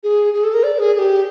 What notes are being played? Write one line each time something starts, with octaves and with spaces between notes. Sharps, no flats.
G#4
G#4
A4
A#4
D5
G#4
G#4
G4